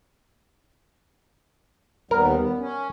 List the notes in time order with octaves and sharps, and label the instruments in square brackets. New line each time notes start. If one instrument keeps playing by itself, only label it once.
[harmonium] D#2 G3 B3 [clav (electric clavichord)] A#4
[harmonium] B3
C#4